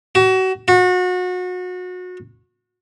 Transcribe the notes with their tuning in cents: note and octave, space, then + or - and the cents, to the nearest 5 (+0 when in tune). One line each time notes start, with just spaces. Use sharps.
F#4 +30
F#4 -30